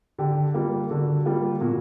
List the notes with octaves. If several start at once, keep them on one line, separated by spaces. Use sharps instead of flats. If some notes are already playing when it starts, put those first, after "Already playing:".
D3 G4
G3 A#3 F4
D3 F#4
G3 A#3 F4
A#2 F#4